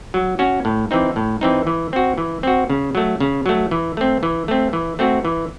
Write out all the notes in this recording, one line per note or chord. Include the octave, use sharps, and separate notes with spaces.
F#3
C#4 F#4
A2
E3 C4 D#4
A2
E3 C4 D#4
E3
C4 F#4
E3
C4 F#4
C#3
F#3 A3
C#3
F#3 A3
E3
A3 C4
E3
A3 C4
E3
A3 C4 F#4
E3